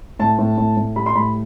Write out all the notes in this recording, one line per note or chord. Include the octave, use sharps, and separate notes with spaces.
A2 A5
A2
A2
A2
G3 B5
C6
A2 B5